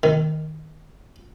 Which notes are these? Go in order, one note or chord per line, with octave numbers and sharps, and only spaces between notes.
D#3